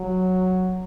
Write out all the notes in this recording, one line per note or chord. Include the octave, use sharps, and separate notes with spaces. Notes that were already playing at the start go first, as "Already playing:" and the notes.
Already playing: F#3